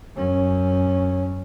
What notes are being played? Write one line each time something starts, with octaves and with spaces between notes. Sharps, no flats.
F#2 C#4